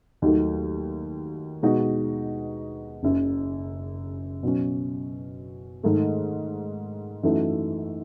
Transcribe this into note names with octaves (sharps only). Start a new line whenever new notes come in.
D#2 D#3 F#3 A3
B2 G#3 D#4 F#4
F#1 F#2 C#3
B2 F#3 C#4
G#2 D#3 A3
F#2 E3 A3 D#4 F#4